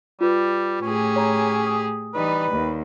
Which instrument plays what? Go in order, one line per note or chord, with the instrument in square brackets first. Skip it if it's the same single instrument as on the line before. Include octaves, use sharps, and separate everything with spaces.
[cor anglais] G3 [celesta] F4 B4
[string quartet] A2 G4 G#4 [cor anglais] C#4
[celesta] C#5 A#5
D#6
[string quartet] E3 G3 D#4 [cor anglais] B4
[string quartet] D#2